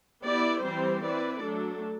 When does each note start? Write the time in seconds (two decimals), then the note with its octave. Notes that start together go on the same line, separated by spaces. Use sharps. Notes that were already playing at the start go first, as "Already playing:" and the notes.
0.24 B3 E4 G4 D5
0.63 E3 G3 C4 G4 C5
1.02 C4 E4 B4 D5
1.43 F#3 A3 D4 A4